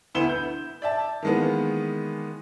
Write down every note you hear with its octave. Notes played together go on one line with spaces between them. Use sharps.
D2 B3 E4 E7 G7
G6
D5 E5 A5
D#3 E3 G#3 A#3 B3